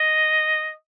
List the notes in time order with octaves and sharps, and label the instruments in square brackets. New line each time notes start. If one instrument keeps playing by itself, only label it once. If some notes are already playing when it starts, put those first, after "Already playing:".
Already playing: [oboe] D#5